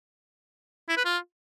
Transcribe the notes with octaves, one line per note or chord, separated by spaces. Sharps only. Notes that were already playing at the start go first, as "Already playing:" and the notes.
E4
B4
F4